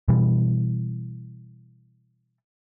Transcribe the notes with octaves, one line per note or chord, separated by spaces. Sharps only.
B2 E3 G3